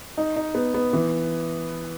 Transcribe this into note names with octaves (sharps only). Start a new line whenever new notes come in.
D#4
D#4
B3
B3
E3